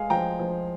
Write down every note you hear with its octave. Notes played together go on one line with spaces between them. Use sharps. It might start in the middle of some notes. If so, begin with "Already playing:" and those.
Already playing: G#3 F5 G#5
F3 G5 A#5
F3